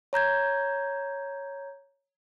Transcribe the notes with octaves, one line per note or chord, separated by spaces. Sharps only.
C#5 A#5 G6 G#6